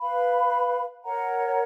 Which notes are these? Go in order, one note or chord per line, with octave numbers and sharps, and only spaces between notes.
B4 F5 B5
A#4 C#5 F#5 A#5